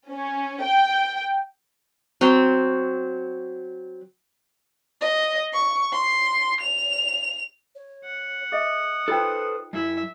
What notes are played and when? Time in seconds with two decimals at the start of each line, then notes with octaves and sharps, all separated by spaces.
0.11 C#4
0.65 G5
2.21 F#3 C4
5.01 D#5
5.53 C#6
5.93 C6
6.61 F7
7.75 C#5
8.05 F#5
8.52 G#4 D#5 E5 D#6
9.08 D#4 F4 A4 B4 C5 G5
9.73 F#2 E4 E5